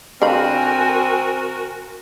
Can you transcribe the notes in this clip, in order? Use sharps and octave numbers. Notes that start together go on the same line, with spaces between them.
D3 C4 F#4 A#4 F5 G#5 B5